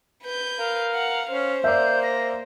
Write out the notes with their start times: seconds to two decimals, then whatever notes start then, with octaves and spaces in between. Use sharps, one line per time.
0.24 B4 G6
0.58 A#4 F5
0.94 F#5
1.31 C#4 C5
1.64 A#3 D5 E5 G6
2.03 A#6